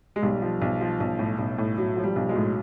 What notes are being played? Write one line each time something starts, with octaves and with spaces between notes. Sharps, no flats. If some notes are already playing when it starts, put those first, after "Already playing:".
G#3
B1 G3
F3
B1
F3
B1
A2
B1
A2
B1 F#3
F3
G3
B1
F#3 G#3
A2